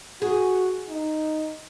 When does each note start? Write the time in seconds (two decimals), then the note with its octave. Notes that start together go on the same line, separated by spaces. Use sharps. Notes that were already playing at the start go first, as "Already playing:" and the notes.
0.22 F#4 G#4
0.90 D#4